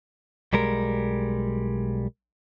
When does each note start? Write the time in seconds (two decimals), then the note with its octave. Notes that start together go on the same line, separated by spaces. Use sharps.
0.53 B1 G3 G#3 A#4